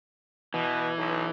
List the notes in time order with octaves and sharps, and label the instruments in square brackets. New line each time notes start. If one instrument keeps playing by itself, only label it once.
[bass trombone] B2 [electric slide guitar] E3
[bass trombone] B1